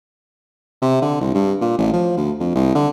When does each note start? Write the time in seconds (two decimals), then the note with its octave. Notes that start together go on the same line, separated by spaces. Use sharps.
0.82 C3
1.02 D3
1.21 C2
1.35 G2
1.61 A#2
1.78 A1
1.93 F3
2.17 D2
2.40 F2
2.55 C2
2.75 D3